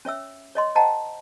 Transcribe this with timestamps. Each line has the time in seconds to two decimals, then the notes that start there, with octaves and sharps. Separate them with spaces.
0.05 C#4 C#5 E5 E6
0.55 C#5 D#5 C6
0.75 C5 D#5 F#5 G5 A5 A#5